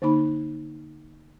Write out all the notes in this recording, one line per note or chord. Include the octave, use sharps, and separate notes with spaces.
D3 A#3 D#4 B5